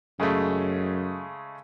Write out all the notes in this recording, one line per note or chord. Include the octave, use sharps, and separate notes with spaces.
F#2 C#3 G#3 A3